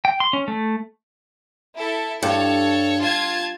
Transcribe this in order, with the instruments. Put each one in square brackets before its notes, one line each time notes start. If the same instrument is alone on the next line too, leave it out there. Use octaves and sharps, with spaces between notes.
[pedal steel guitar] G5
C6
C#4
A3
[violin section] E4 A4
[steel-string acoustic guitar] G2 [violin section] A4 C#5
[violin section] F4 A5 G#6